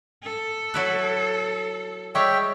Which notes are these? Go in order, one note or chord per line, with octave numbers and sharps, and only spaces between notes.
A4
F#3 E4 B4
G3 G#3 C#5 E5 G5